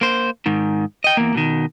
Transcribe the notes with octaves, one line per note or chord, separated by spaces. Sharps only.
A#3 C5
G#2 D#3
D#5 G5
E2 A#3
B2 D#3